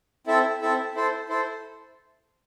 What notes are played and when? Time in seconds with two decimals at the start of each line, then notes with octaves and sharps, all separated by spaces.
0.27 C4 E4 A4 E5
0.61 C4 E4 A4 E5
0.95 E4 A4 C5
1.29 E4 A4 C5